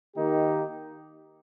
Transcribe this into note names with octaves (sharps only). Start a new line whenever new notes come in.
D#3 A#3 D#4 G4